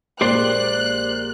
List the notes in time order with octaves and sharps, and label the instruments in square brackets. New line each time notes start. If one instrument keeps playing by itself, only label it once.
[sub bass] A#1 [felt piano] A#2 G#3 A#3 [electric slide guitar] G4 C5 D5 [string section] F#6